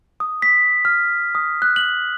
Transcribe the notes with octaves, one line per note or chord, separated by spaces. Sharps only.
D#6
B6
F6
D#6
F#6
F#7